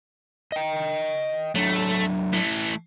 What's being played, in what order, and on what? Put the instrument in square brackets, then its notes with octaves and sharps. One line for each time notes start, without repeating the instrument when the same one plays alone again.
[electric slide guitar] D#5 G5
[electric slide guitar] F#3 D4 [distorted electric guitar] A3
[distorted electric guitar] E3 A3